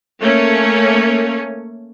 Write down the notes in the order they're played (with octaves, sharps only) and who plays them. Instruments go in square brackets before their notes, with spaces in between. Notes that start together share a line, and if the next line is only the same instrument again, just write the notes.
[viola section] A3 A#3 C#4 C#5